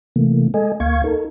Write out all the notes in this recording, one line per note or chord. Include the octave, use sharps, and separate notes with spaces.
C3 E3 A3 A#3
G#3 A4 D#5 G#5
D2 A#3 F5 C#6 G#6
D#4 A4 A#4